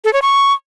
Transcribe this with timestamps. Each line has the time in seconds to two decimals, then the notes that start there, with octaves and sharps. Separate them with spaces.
0.04 A4
0.13 C#5
0.22 C#6